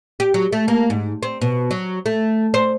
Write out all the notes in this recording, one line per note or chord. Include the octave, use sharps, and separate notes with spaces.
G4
F#3
A3
A#3
G#2
C4
B2
F#3
A3
C5